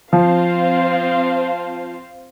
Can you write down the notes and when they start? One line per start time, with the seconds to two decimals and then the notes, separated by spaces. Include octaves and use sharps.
0.13 F3 C4 F4 C5 F5